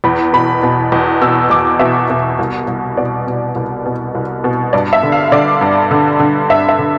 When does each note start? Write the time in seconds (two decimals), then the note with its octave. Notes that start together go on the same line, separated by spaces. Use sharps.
0.04 E2 B5
0.33 B2 B5
0.63 B2
0.92 E2
1.21 B2 E6
1.50 E2 D6
1.79 B2 E5
2.10 B2
2.39 C2
2.68 C2
2.97 B2 D5
3.27 B2
3.56 C2
3.86 B2
4.15 C2
4.44 B2
4.73 G2 D5
4.93 E5
5.03 D3
5.12 F5
5.31 D3 D5
5.61 G2
5.91 D3
6.19 D3
6.50 G2 E5
6.69 E5
6.79 D3